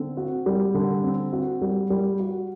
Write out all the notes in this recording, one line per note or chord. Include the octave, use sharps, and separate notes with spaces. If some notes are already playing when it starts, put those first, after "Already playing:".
Already playing: D3 C4
F#4
G3
D3
C4
F#4
G3
G3
F#4